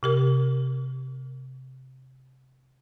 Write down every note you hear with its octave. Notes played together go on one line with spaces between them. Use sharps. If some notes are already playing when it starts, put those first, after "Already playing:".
C3 G4 A#4